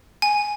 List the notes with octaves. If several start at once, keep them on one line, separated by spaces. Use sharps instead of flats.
G#5